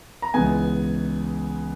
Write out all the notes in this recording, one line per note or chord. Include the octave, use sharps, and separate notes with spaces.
A#5
C#2 C#3 E3 G#3 B3 G#5